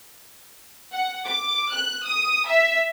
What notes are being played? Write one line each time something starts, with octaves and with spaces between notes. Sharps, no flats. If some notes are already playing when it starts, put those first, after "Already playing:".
F#5
D6
F#6
D#6
E5